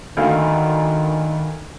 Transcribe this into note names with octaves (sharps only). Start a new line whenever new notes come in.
D2 D#3 F5